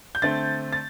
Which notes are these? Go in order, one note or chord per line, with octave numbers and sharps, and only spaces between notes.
G6
D3 A3 C4 A6
A6